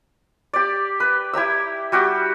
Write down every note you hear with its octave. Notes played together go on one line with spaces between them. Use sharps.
G4 D5
B4
E4 G4 A#5 E6
G3 F#4 G4